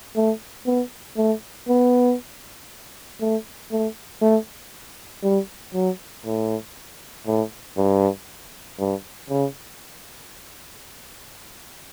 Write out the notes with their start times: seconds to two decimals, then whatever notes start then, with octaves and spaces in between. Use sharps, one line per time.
0.16 A3
0.66 B3
1.17 A3
1.68 B3
3.21 A3
3.71 A3
4.21 A3
5.23 G3
5.74 F#3
6.25 A2
7.27 A2
7.77 G2
8.79 G2
9.30 C#3